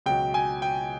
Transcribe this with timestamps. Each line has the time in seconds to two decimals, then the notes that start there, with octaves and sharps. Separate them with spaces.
0.06 C#2 B2 F#3 G5
0.34 G#5
0.62 G5